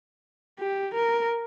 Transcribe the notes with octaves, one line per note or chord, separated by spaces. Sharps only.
G4
A#4